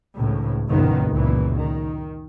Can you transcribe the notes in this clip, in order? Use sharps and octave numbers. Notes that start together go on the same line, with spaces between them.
G#1 C#2 A2
F#1 B1 A#2 D#3 B3
C#2 F#2 A#2 E3
D#3